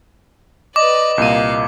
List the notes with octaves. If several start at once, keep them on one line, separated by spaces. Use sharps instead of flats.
B4 D5 D#5 D6
C2 A#2 A#3 F5 D#7